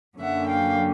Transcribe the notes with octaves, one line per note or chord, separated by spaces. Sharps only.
F#2 D3 F#3 A#3 C#4 E5 F#5
F5 G5